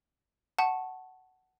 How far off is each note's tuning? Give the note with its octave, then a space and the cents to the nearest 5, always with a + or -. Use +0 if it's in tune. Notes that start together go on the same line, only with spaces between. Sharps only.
F#5 +10 A5 +0 C#6 -10